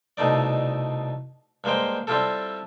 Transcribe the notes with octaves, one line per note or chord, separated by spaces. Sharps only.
C2 B2 A3 D#4 D5
G2 G#3 A#3 C5 G5
G3 C4 E4 F4 G4 A4